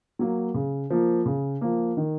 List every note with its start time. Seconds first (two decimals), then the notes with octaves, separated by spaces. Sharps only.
0.19 F#3 A#3
0.54 C#3
0.90 F3 A#3
1.26 C#3
1.61 F3 A#3
1.97 D#3